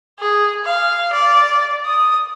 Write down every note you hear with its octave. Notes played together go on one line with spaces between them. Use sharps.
G#4
F5
D5
D#6